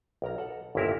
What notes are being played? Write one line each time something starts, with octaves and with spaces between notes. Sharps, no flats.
B1 A#4 A#5
A4 F#5
G1 D#2 A#2 E4 A#4 E5